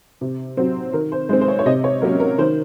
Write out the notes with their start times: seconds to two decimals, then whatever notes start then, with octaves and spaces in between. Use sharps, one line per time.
0.21 C3
0.57 F#3 C4
0.93 D#3 A#4
1.12 C5
1.29 G#3 C5
1.33 C4
1.41 C5
1.48 C#5
1.59 C#5
1.66 C3 D#5
1.84 C#5
2.02 F#3 A#3 C#4 A#4
2.20 A#4
2.38 D#3 C5